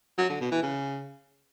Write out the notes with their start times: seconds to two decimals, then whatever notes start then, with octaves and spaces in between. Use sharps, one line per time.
0.18 F#3
0.29 D3
0.40 B2
0.51 E3
0.63 C#3